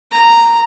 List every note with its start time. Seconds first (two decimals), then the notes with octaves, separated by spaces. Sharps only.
0.11 A#5